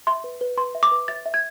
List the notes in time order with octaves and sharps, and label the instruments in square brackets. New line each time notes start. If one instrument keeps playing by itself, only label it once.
[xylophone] E5 C6
B4
B4
B4 C6
E5
D6
B4
E5 A6
E5
G#6